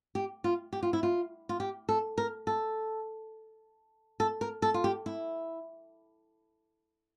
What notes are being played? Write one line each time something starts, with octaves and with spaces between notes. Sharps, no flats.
G4
F4
G4
F4
E4
F4
F4
G4
A4
A#4
A4
A4
A#4
A4
F4
G4
E4